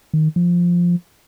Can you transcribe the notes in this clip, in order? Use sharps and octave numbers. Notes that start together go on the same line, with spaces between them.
D#3
F3